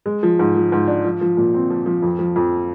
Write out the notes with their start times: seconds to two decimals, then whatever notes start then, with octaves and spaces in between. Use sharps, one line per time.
0.06 G#3
0.23 F3
0.39 G#2
0.56 F3
0.72 G#2
0.88 D4
1.04 F3
1.21 F3
1.37 A#2
1.54 C4
1.70 F3
1.86 F3
2.02 F2
2.19 F3
2.36 F2